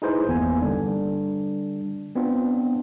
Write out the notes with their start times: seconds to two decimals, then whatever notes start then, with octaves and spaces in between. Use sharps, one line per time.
0.02 D#4 E4 G#4 B4 C5
0.27 G1 E2 A#3 B3 G#5
0.62 D3 G3 D4
2.16 B3 C4 D4 F4